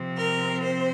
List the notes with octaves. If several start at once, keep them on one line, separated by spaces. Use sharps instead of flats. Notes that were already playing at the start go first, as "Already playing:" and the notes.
Already playing: C3 F3 C4
A#4
C5